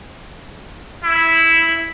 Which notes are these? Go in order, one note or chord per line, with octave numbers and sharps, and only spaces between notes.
E4